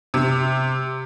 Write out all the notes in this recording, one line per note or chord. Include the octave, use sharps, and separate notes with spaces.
C3